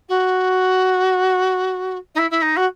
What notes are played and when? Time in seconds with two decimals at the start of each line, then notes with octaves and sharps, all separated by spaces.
0.08 F#4
2.15 D#4
2.18 E4
2.30 E4
2.41 D#4
2.56 F#4